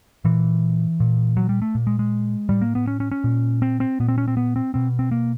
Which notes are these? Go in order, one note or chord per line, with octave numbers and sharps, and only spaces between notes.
A#2 E3
A#2
F#3
G3
A3
A#2
G#3
G#3
A2 G3
A#3
B3
C#4
C#4
C#4
A#2
C4
C4
A#2 B3
C4
C#4
C4
B3
C4
B2 C4
C4
A#3